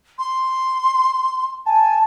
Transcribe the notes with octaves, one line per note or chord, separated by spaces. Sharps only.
C6
G#5 A5